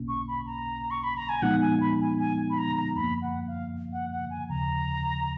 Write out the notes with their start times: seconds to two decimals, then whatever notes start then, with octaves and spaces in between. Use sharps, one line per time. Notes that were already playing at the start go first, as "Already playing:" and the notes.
Already playing: B1 B2 A#3 C#4
0.08 C#6
0.28 B5
0.46 A#5
0.91 C#6
1.04 B5
1.16 A#5
1.29 G#5
1.42 A#2 F3 G#3 B3 D#4 F#5
1.61 G#5
1.81 B5
2.00 G#5
2.19 G#5
2.50 B5
2.58 A#5
2.77 A#5
2.96 F#2 F3 A#3 B5
3.22 F#5
3.48 F5
3.92 F#5
4.12 F#5
4.30 G#5
4.49 D#2 C#3 F3 A#5